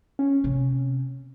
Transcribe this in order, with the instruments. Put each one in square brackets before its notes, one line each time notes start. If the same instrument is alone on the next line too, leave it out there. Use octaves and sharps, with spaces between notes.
[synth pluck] C#4
[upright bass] C3 C4